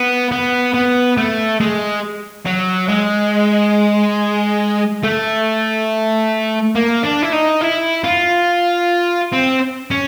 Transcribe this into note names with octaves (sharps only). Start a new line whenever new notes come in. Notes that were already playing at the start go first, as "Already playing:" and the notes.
Already playing: B3
B3
B3
A3
G#3
F#3
G#3
A3
A#3
D4
E4
D#4
E4
F4
C4
C#4